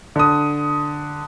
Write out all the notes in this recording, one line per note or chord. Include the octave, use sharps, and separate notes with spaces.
D3 D#6